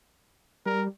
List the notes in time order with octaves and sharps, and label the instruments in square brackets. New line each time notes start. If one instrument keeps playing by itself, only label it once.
[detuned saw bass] G3 [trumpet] A#4